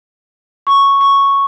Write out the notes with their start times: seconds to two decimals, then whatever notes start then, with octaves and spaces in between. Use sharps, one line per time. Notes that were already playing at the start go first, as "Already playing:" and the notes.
0.67 C#6
1.01 C#6